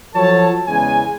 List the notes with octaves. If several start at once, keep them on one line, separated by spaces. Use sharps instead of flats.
F3 F#3 A4 C#5 A5
E2 C#3 G#3 G#5